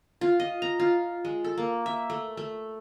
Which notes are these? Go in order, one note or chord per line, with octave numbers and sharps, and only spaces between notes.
F4
D#5
A#5
F4
G#3
A4
A#3
E5
A3
A3